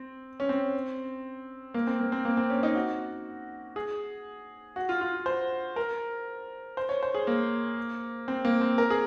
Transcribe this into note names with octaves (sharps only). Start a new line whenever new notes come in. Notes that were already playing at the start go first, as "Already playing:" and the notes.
Already playing: C4
C#4
C4
A#3
C4
A#3
C4
A#3
C4
C#4
D#4
F#4
G#4
F#4
F4
F4
C5
A#4
C5
C#5
C5
G#4
A#3
C4
A#3
C4
A#4
G#4